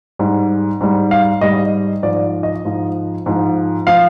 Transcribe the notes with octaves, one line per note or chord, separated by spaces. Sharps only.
G#2 G3
G#2 G3
F5
G#2 G3 D#5
G#2 F3 D5
D#5
G#2 F3
G#2 F3
F3 F5